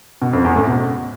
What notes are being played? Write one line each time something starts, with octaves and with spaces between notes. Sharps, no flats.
B2
F2
E2
A2
B2